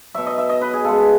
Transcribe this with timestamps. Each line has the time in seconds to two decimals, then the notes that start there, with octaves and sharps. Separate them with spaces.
0.14 B2 F#3 E5
0.26 D#5
0.38 E5
0.49 D#5
0.61 B4
0.73 G#4
0.85 C#3 G#3 A4